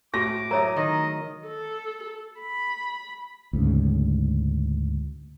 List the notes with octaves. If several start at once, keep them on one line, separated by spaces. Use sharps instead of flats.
A2 F#4 A5 C#6 D6 A#6
F#3 A#4 C#5 E5 A#5 D#6
D#3 D#5
A4
B5
D2 G#2 C#3